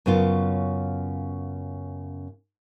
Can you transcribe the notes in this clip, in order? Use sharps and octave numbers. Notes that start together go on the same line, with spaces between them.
F#2 C#3 B3 F4